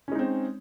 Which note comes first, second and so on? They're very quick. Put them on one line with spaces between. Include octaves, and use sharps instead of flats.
C#4 G#3 D#4 C4